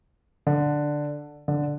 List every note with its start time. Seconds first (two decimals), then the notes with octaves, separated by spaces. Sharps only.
0.47 D3
1.48 D3